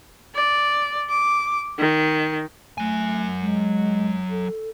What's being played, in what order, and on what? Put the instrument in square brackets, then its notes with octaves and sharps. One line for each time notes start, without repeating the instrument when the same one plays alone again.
[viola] D5
D6
D#3
[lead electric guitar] F#3 G#5 [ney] A3
[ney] G#3
A4